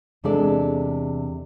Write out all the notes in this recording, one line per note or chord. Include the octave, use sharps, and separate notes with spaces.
E2 C3 G#3 D4 A4 D5